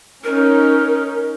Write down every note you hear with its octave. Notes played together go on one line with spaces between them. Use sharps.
C#4 D#4 A#4